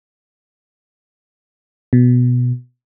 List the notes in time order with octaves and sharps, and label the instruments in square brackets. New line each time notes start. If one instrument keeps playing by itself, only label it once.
[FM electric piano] B2